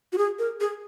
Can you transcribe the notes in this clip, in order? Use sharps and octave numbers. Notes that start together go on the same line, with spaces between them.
F#4
G#4
A#4
G#4